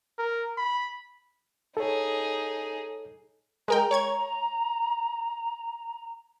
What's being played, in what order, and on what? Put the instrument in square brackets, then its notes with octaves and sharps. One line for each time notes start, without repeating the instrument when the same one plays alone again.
[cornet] A#4
B5
[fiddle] D#4 G#4 [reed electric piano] A4 C#5
[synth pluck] G#3 A#4 G5 [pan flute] A#5
[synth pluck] C#5 C#6 G#6